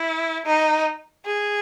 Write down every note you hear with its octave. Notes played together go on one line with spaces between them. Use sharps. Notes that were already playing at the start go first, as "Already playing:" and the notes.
Already playing: E4
D#4
G#4